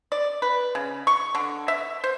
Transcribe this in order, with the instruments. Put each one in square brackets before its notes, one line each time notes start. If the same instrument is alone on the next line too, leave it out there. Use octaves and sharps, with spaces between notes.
[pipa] D5
B4
C#3
C#6
D3
E5
C5